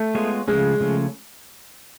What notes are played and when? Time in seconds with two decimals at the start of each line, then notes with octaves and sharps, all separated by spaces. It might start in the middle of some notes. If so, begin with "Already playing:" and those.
Already playing: A3
0.15 G#3 B3 F4 G#4 C#5
0.48 C#3 F3 G#3 A3 C#4
0.80 C#3 F3 A3 C#4